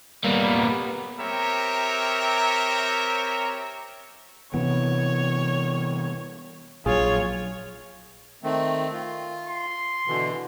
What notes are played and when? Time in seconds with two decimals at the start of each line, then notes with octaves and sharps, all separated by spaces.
0.24 G3 A#3 B3
1.19 C4 G4 A#4 C#5 E5 A#5
4.54 C3 E3 B3 C#5
6.86 A#1 F#3 F4 G#4 C#5
8.44 D#3 A3 C4
8.93 F4
9.48 C6
10.07 B2 D3 E3